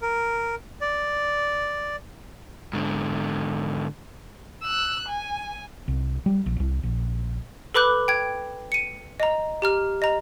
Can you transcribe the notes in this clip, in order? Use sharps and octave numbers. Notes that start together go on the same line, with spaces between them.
A#4
D5
G#2 D3
E6 F#6
G#5
C2
G3
A#1
C2
A#1
A4 B4 B5 D6 F#6 G6
G5 G#6
C#7 D#7
D#5 A#5
G4 A#5 F6
D#5 A#5